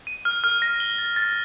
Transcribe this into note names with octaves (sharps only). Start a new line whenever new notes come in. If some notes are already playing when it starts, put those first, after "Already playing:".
D#7
F6
F6
A#6
G7
A6
A6